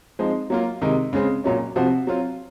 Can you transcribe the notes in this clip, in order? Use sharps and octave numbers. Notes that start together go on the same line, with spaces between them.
F3 G#3 C4 D#4
F#3 A#3 F4
C3 D#3 G#3 D#4
C#3 G#3 C4
A#2 F#3 C#4
C3 F3 C4 F#4
F#3 C4 F4